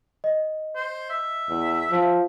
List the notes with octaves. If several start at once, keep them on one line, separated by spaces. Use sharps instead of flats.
D#5
C5
E5
E2
F3